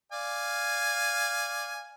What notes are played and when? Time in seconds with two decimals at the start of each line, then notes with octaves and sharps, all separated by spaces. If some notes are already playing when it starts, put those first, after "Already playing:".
0.12 D5 F5 G#5